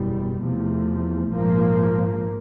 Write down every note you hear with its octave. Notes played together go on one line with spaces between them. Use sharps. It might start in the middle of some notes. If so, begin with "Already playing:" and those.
Already playing: F#1 E2 B2 G3
E2 C3 F3 A3
A#1 G#2 F3 A#3